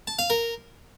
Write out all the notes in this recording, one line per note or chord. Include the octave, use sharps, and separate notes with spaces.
A5
F5
A#4